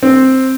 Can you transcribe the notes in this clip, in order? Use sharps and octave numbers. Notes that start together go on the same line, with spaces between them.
C4